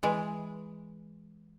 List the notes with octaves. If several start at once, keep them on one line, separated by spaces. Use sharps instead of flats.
E3 G#3